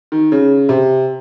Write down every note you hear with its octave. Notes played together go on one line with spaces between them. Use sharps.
D#3
C#3
C3